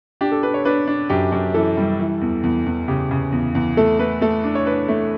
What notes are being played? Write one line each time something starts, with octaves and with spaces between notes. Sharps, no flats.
D4 G4
A4
D4 B4
C#5
D4 B4
D4
F#2 G4
F#2
E3 A4
G3
E3
E2
E2
E2
C#3 G4
C#3
E2
E2
A3 A4
A3 B4
A3 A4
D4
C#5
D4 B4
A3